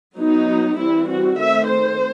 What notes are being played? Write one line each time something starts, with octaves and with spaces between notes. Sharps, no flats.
F#3 B3 D#4
E3 G3 C4 E4
F#4
D#3 A3 C4 E5
C5